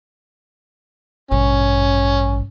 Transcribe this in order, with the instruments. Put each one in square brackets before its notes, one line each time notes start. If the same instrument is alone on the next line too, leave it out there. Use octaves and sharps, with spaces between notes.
[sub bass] A1 [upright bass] G2 B2 [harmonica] C#4